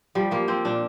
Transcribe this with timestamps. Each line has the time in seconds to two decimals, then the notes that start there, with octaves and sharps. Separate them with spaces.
0.15 F3 G3
0.31 F3 A#3
0.48 F3 C4
0.65 A#2 D4